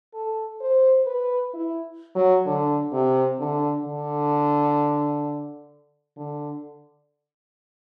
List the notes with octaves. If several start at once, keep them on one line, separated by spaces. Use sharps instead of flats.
A4
C5
B4
E4
F#3
D3
C3
D3
D3
D3